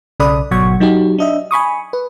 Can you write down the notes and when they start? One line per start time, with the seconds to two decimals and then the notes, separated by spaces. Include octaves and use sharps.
0.20 B1 C#3 A4 D5 B5 D#6
0.51 G#1 B2 F#3 F#5 C#6 G#6
0.80 F#3 D#4 F#4 G4
1.18 D4 D#5 E5
1.51 G#5 B5 C#6 D#6
1.93 B4